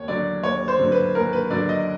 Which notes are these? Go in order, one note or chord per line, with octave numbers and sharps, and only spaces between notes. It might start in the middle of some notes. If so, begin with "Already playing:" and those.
Already playing: D#2 C#5
D3 F#3 D5
D#2 C#5
C5
D3 F#3
B4
D#2 A#4
B4
D3 F#3 D5
D#5